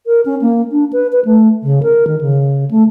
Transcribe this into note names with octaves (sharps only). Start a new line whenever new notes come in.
A#4
C#4
A#3
D4
B4
B4
A3
C#3
A#4
D#3
C#3
A3